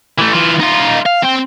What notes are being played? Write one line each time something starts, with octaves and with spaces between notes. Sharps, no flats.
E3 A3
E3 F4
D#4 F4
F5
C4 G5